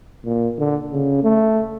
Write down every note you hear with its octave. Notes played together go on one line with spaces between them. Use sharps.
A#2
D3
C#3
A3